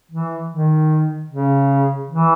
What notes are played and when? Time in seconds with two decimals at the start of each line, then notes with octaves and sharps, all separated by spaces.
0.11 E3
0.51 D#3
1.31 C#3
2.10 E3